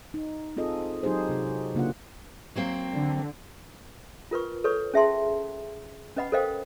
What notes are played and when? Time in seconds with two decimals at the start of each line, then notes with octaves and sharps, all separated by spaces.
0.14 D#4
0.57 C4 F4 G#4 A4 D#5
1.03 F#3 D#4 G4 G#4 C5
1.29 C3 F#4
1.75 C#3 A#3 D4 F4 F#5
2.55 F#3 A#3 C4
2.92 D3
4.31 F4 A#4 B4 C#6
4.64 A4 B4 C#5 C#6
4.94 C#4 G#4 E5 G5 A5 C6
6.16 C#4 B4 D#5 F#5 B5
6.32 A4 A#4 C5 D#5 F5 G5